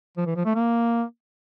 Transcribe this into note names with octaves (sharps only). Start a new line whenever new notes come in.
F3
E3
F3
A3
A#3